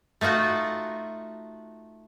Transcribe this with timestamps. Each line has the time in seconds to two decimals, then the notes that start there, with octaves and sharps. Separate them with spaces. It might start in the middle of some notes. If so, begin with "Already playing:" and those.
0.21 A3 D#4 F4 F#4 F#5